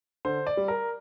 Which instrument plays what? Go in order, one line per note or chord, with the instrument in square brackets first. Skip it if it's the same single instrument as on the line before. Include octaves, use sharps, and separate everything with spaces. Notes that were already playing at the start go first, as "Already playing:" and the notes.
[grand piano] D3 C5
D5
G3
A#4